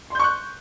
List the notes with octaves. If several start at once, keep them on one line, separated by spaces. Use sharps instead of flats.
C6 C#6 F#6 G6